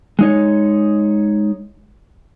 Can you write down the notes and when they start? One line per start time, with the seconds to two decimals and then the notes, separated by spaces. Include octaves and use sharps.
0.19 G#3 D#4 C#5